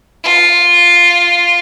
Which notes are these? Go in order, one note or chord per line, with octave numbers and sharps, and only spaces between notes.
F4